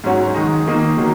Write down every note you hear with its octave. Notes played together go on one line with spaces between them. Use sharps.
G#2 F#3 C#4 F#4
D#3 G#3 D#4
D#3 A#3 D#4
D#3 F#3 A#3